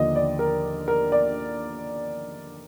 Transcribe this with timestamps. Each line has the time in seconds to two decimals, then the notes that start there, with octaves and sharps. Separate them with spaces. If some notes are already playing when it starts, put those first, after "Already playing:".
Already playing: D#2 D3 F3 D#5
0.16 D5
0.39 A#4
0.88 A#4
1.12 D5